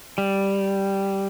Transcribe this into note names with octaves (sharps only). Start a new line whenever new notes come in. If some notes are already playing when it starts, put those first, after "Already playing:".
G3